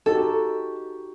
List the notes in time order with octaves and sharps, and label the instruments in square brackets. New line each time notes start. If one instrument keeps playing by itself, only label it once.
[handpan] D#4 F#4 G4 [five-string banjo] A4